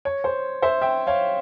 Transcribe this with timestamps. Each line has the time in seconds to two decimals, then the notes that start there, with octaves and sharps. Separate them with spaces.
0.05 C#5
0.24 C5
0.62 C5 E5
0.81 E5 G5
1.07 C#5 F5